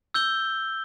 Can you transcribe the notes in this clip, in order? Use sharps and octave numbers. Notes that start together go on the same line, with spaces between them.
E6 G6 G7